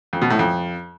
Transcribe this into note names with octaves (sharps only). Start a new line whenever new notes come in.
F2
B2
A2
F2